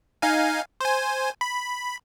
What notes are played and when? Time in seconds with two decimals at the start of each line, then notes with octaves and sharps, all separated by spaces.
0.22 D#4 F5 G#5
0.81 C5 G#5
1.41 B5